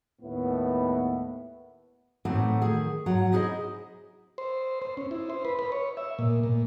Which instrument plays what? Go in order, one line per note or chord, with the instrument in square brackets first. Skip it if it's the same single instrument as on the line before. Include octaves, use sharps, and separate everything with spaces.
[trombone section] D#2 A2 B3
[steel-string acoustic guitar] A2 E3 A3 C4 D#4 F#5
D#3 G#4
G#2 F#3 F#5 A#5
D#4 E4 G#4 B4 C5 D#5
[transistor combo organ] C5
C5
C#4
E4
C5
B4
B4
C#5
E5
A#2
A#2